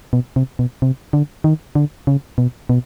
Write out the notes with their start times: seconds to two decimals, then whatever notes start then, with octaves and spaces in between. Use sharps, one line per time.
0.13 B2
0.36 C3
0.59 B2
0.82 C3
1.13 D3
1.44 D#3
1.75 D3
2.07 C#3
2.38 B2
2.69 B2